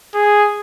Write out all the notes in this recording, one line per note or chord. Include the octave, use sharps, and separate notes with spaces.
G#4